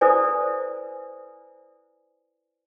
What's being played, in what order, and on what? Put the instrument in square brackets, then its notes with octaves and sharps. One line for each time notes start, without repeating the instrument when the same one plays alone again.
[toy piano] E4 A4 B4 C5 D5 G#5